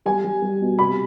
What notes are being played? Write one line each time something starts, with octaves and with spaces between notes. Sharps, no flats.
G3 G#5
G3
G3
B2
C3 B5